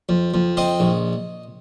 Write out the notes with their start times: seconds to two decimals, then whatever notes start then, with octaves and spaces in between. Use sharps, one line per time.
0.09 F2
0.34 F2
0.57 C4 D#5
0.80 A#1